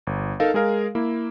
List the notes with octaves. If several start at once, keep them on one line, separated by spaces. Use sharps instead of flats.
G1
D#4 A4 A#4 F5
G#3 G#4 A#4 F5
A#3 E4